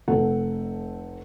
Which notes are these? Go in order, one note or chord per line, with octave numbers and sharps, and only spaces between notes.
F1 C4 A4 F#5